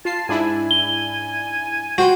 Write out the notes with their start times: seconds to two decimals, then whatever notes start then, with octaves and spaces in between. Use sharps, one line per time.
0.05 F4 A5 C7
0.29 G#2 D4 E4 G#5
0.71 G7
1.98 F#4 C5 G5 C6